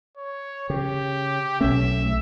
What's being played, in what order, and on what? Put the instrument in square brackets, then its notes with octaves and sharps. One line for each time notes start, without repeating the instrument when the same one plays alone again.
[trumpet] C#5
[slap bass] C#3 [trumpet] G4
[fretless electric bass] B1 C#4 [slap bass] A3 [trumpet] E5